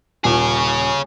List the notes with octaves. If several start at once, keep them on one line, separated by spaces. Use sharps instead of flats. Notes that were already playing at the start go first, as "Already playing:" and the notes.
D#1 G#4 C#5